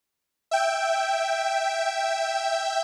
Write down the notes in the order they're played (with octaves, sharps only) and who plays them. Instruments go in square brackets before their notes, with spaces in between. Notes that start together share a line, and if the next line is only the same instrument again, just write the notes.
[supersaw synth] E5 G5